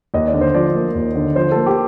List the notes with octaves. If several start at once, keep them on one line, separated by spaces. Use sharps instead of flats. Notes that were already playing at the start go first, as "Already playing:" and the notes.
D#2 D#5
D5
D3
C5
F3 D5
A#3
D#2
D3
F3 C5
A#3 A4
G4